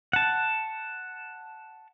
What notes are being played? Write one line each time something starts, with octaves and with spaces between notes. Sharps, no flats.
F#5 A5